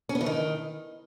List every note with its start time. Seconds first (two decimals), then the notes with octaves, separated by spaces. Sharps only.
0.09 C#4
0.15 B3
0.21 E3
0.26 D#3